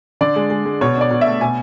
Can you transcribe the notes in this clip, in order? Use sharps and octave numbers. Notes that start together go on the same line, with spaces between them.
D3 D5
G#3
G#3
G#3
B2 C#5
D4 D5
B2
E5
A3
B2 G#5